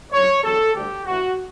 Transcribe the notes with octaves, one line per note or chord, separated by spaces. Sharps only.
F#1 F#2 D3 F#3 C#5
E2 D3 F#3 A4
D2 D3 G3 G4
A1 A2 E3 F#4